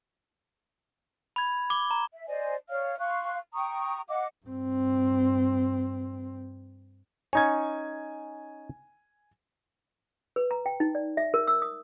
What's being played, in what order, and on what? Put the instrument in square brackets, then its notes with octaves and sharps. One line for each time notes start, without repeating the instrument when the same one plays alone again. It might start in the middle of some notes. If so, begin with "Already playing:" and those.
[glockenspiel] B5 G#6
D6 G7
A#5
[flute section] E5
C5 D5 D#5 G#5
C#5 D5 F5 F6
F5 C6 C#6 F#6
G5 A#5 C#6 D#6
D#5 F5 F#5 D6
[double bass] G2 C4
[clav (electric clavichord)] C#4 D#4 C#5 [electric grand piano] G#5 G#6
[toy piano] B4
A#5
G5
D#4
D5
E5
A#4
E6
D#6